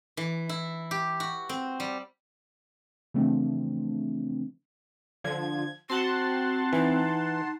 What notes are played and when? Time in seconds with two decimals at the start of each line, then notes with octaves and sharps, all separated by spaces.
0.17 E3
0.49 E4
0.91 G4
1.20 F#4
1.49 C4
1.80 G3
3.14 C#3 E3 F3 A3 C4 D4
5.24 D3 F3 G#6
5.90 C4 F#4 F#5 A5 C6
6.73 E3 D#4